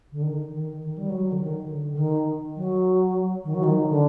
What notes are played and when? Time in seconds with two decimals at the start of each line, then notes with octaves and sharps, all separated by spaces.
0.12 D3
0.22 D#3
0.51 D#3
0.81 D#3
0.98 G3
1.10 F#3
1.32 D3
1.39 D#3
1.68 D3
1.93 D3
1.98 D#3
2.56 F#3
3.44 D#3
3.54 F#3
3.63 D#3
3.89 D3